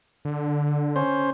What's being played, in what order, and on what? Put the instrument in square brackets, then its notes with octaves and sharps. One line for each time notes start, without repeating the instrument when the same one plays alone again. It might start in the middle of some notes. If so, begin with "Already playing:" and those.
[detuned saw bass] D3
[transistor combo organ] C#4 C5